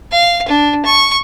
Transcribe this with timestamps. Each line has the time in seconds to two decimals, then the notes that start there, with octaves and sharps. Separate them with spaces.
0.12 F5
0.48 D4
0.85 C#6